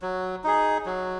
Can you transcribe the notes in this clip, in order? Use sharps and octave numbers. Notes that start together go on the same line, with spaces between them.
F#3
D#4 G#4
F#3